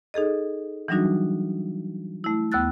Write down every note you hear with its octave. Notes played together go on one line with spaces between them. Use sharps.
D#4 G#4 A4 D#5
E3 F#3 G3 D4 D#4 F#4
A3 E4
D#2 B3 E6 F#6 A6